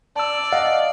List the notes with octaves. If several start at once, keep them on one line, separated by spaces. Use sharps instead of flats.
D5 A5 E6
D#5 F5 F#5